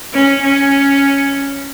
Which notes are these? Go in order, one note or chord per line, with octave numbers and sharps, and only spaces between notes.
C#4
C#4